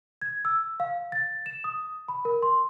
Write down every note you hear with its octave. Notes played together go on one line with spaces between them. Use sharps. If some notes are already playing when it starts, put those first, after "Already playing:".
G#6
E6
F5
A6
E7
D#6
B5
A#4
C6